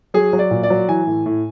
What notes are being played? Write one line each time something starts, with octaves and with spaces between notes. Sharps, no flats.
F#3 G#4
F#3
D5
A#2
D5
F#3
E3 G#5
A2
A2